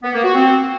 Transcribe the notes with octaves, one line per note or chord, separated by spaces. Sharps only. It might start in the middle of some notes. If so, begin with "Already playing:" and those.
B3
A#3
F#4
C4